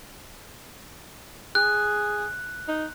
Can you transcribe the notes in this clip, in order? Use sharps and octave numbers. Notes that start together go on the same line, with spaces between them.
G#4 F#6
D#4